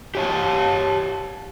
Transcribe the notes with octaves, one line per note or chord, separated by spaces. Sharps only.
G4 C#5 A5